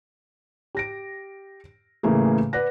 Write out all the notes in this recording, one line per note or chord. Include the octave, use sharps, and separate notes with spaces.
G4 A#6 D7
A2 C#3 E3 A3 A#3 G#4
B4 D5 F#5 F#6 A#6